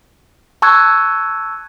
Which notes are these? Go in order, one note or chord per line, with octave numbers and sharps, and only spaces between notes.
A5 C#6 E6 F#6 G#6